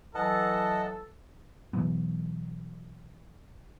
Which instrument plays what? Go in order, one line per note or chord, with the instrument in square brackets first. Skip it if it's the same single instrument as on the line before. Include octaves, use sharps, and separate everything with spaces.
[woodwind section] E3 F#3 [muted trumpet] A4 [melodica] D#5 F#5 A5
[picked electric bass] B2 E3 F#3 B3